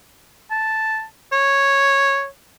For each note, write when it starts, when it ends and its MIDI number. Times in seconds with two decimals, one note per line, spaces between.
0.51 1.04 81
1.32 2.27 73